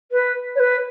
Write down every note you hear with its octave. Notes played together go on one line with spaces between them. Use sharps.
B4
C#5
B4